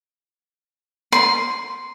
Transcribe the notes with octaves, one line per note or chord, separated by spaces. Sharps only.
C6